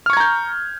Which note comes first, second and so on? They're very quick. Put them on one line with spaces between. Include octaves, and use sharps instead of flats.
F6 C#6 G#6 A#5 G6